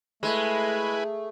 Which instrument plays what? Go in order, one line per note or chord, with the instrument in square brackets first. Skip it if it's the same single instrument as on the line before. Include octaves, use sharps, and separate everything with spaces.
[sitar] G#3 [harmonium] A3 [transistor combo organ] E4 B4 G#5